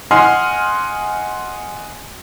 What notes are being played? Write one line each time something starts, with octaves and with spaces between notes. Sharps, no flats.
D#5 F#5 G#5 C6 F6 C7